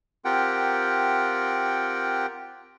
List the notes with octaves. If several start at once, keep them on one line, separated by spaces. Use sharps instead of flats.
C4 F4 G4 A#4 F#5 G5